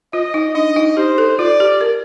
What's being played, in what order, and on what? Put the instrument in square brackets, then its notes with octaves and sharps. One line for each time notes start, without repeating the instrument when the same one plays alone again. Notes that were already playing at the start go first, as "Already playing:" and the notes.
[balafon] F4 [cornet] D#5
[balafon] D#4
[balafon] D4 [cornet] D#5
[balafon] D#4
[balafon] G4 [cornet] C5
[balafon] A4
[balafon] F4 [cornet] D5
[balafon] G4
A#4